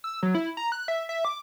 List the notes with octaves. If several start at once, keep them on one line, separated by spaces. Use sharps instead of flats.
E6
F#3
E4
A#5
F#6
E5
E5
D6